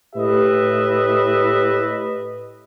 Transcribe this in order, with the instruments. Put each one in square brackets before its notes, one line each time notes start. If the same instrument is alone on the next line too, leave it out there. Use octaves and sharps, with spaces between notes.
[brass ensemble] A2 G4 B4 D#5 E5